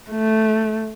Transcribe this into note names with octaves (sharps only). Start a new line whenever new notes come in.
A3